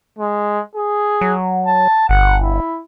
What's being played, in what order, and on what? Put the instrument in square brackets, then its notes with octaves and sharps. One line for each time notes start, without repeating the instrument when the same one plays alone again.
[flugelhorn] G#3
G#4
[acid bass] F#3
[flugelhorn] A5
[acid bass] G1 [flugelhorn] F#5
[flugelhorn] E4